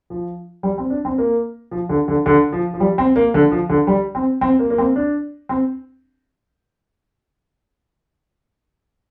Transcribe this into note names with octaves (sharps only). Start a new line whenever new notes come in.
F3
G3
C4
D4
C4
A#3
F3
D3
D3
D3
F3
F3
G3
C4
A#3
D3
F3
D3
G3
C4
C4
A#3
A#3
C4
D4
C4